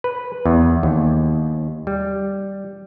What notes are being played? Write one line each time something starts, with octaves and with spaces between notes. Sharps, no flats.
B4
E2
D#2
G3